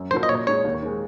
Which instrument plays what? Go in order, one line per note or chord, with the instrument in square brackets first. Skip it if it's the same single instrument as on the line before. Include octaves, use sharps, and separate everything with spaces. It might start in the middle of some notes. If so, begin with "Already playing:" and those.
Already playing: [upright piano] F#2
[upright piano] F3 A#3 D#4 F#4 [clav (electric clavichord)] C5
[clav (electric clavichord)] D#5
[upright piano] A#2 [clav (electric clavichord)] C#5
[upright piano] G#3 D#4 [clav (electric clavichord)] C#5
[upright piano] D#2
D#3 G#3